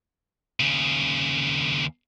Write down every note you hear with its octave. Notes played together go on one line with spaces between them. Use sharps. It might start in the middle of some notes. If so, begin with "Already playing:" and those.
D#2 C#3